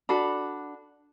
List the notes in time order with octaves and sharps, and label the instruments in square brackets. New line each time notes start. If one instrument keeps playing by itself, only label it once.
[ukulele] D4 F#4 A4 B5